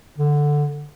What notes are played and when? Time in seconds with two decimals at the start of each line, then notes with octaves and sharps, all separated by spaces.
0.18 D3